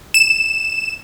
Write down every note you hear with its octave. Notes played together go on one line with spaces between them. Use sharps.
E7